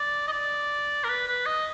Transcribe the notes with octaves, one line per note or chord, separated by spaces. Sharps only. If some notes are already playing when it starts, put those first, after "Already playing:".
Already playing: D5
D#5
D5
A#4
B4
B4
D#5